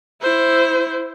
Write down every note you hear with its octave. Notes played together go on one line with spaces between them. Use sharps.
E4 C5